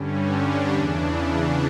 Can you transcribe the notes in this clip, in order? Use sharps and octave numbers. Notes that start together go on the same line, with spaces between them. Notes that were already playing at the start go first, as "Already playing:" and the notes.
Already playing: G2 D3 G3 C#4
D4
E2 C#3 E3 D4